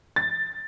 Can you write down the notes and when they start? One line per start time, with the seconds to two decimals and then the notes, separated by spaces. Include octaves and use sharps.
0.16 A6